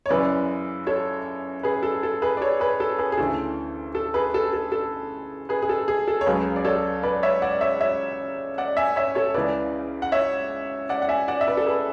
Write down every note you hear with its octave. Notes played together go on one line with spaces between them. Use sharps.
C#5
F#2 C#3 E3 B4 D5
A4 C#5
G#4 B4
A4
A4
G#4 B4
D5
A4 C#5
G#4 B4
A4
G#4 B4
G#4
D2 C#3 E3 A4
A4
G#4 B4
A4
A4
A4
G#4 B4
G#4
A4
G#4
A4
C#5
C#2 C#3 F#3 G#4 B4
D5
A4 C#5
B4 D5
C#5 E5
D5 F#5
C#5 E5
C#5 E5
D5 F#5
E5 G#5
C#5 E5
A4 C#5
C#2 C#3 E3 B4 D5
F#5
C#5 E5
D5 F#5
F#5
E5 G#5
D5 F#5
E5
B4 D5
A4
G#4 B4